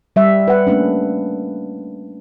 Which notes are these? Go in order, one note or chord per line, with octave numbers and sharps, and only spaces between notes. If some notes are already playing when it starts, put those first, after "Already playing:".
G3 E5
B4 F#5
A3 A#3 C#4 D4